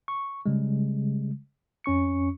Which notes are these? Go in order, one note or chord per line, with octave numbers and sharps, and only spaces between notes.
C#6
C#3 G3 G#3
F2 C#4 C#6 C#7